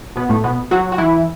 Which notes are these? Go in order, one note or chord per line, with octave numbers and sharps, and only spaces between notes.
B2 B3
A2 A3
B2 B3
F#3 F#4
F#4
E3 E4